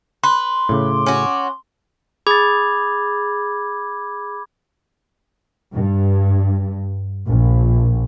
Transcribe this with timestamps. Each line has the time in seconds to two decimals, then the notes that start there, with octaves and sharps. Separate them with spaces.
0.23 B4 C6
0.69 A2 C#3 D6
1.06 C#4 F#4
2.27 G#4 B5 D6 G#6 A6
5.74 G2
7.28 A#1